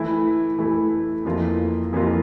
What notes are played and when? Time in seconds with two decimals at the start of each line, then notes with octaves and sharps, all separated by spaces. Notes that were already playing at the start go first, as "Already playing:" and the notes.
Already playing: E3 A3 E4
0.59 E3 A3 E4
1.25 F2 E3 A#3 F4
1.93 F2 E3 A#3 F4